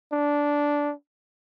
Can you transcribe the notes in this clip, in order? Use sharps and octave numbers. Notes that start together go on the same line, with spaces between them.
D4